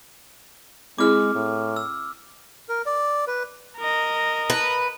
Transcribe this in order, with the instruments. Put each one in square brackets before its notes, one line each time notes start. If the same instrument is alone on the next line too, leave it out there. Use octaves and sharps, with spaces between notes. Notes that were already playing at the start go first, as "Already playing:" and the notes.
[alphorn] G#3 [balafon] C4 E4 G#4 [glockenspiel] D6 F6
[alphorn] A2
[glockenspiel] E6
[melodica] A#4
D5
B4
[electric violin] A#4 D#5
[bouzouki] B4